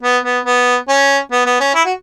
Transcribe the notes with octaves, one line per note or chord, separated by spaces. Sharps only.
B3
B3
B3
C#4
B3
B3
C#4
E4
F#4